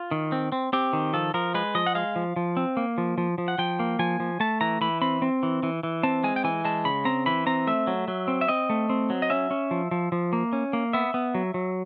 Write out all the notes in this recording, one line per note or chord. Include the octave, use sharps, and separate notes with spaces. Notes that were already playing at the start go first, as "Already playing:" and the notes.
Already playing: F4
D#3
C4
C4
C4 G4
D#3
F3 A4
F3 A#4
G#3 B4
F3 D#5
F#5
G#3 F5
F3
F3
C4
A#3
F3
F3
F3
F#5
F3 G5
A#3
F3 G#5
F3
A3 A5
E3 A#5
E3 B5
C4 B5
C4
E3
E3
E3
C4 A5
G#3 G#5
G5
E3 G#5
G#3 A5
C#3 B5
C4 A#5
E3 B5
C4 A#5
A3 E5
F#3
F#3
C4
E5
C4 D#5
A3
C4
F#3
D#5
C#4 E5
C#4
F3
F3
F3
A#3
C#4
A#3
B3 E5
B3
F#3
F#3